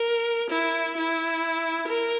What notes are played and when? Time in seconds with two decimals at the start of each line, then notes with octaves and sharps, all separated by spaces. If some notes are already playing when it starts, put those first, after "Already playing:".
Already playing: A#4
0.50 E4
0.97 E4
1.88 A#4